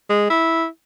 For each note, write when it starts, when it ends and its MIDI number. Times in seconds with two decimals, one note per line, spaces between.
0.10 0.29 56
0.30 0.66 64